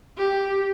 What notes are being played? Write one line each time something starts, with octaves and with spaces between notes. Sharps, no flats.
G4